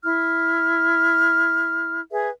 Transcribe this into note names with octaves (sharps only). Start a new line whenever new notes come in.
E4 F6
G#4 B4 E5